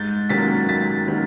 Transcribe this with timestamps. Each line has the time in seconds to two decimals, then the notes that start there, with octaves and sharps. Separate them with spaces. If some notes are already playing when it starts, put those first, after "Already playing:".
Already playing: G#2 G6 A6
0.29 D#3 F#3 A#3 C#4 A6 B6
0.69 G#2 A6 B6
1.08 D#3 F#3 A#3 C#4